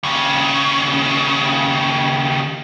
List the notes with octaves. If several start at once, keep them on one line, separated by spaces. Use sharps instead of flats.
D#2 C#3